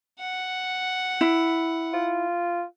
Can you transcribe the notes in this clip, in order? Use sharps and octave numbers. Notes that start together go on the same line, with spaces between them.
F#5
E4
F4